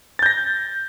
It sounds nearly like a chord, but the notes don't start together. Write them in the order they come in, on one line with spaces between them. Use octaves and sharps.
A6 G6 A#6